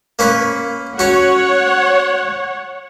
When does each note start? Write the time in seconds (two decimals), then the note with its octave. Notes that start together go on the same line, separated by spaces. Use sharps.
0.19 A#3 C#4 B4
0.99 C#4 F#4 C#5 F#5